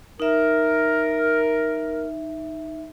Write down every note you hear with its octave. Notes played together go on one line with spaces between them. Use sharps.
D#4 A#4 E5